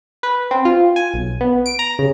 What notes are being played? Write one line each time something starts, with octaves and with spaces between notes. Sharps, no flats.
B4
C4
F4
G#5
B1
B3
D7
A#5
C#3